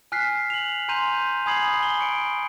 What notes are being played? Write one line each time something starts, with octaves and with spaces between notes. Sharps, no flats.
G#5 F6 F#6 B6 C7
F7 F#7
G#5 A#5 C6 G6 D#7 F7
G#5 B5 D#6 G#6 C7 F#7
G#5 G7
C#6 C#7 D7